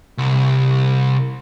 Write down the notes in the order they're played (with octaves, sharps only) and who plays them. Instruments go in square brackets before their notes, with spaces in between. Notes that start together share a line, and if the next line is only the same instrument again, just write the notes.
[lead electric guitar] C2